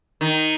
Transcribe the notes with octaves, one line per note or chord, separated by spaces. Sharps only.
D#3